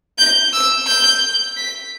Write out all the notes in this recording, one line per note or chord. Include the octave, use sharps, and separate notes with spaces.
G6
E6
G6
B6